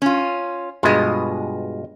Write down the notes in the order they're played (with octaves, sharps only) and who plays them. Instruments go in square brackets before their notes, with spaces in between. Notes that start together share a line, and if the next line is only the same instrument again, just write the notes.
[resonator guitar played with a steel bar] C#4 F4
[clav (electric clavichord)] G2 B2 G#3 [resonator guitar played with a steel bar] F4 D#5